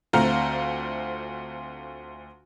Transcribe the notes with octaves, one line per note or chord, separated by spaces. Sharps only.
D2 A3 C4 F4 F5 A#5